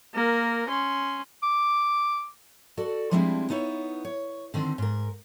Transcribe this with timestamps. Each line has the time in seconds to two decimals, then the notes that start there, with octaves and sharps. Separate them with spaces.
0.15 A#3 A#4
0.69 C#4 C6
1.43 D6
2.77 F#4 A4 D5
3.11 F3 G3 G#3 C4 D4 E4
3.50 B3 D#4 E4 C#5
4.05 C#5
4.54 D3 D#3 C4
4.78 G#2 A#4